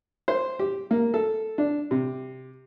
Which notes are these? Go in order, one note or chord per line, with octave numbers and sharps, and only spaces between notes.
C5
G4
A#3
A4
D4
C3